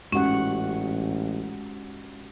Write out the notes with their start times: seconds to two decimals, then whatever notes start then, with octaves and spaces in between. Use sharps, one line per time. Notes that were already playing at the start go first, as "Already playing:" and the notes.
0.12 A1 G#2 C#4 F#4 G4 F#5